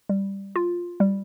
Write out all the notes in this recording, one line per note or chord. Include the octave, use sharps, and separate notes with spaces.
G3
F4
G3